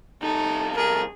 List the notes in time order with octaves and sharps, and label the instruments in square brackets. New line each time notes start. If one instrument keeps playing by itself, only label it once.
[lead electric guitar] C2 A4 [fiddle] D#4
[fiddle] G#4 [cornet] A#4